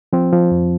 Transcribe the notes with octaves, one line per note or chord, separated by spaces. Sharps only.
F3 C4
F3
F2